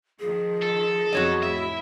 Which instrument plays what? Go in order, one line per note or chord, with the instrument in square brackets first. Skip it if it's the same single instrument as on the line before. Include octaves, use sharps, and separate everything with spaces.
[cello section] D#3 F3 [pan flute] G#4
[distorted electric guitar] A4
[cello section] F2 B2 F#3 [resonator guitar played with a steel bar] F#4 C#5 D#5
[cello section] A2 E4 [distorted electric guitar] E5